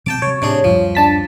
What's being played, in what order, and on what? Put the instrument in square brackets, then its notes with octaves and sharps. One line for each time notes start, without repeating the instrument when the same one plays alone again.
[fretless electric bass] B2 F#3 C4 [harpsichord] G5 A5 D6
[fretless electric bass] C3 F#3 [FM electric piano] C#5
[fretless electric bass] A2 [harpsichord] C3 D4 G#4
[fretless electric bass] D1 F#2 G3 [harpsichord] F3
[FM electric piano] D4 A5 B6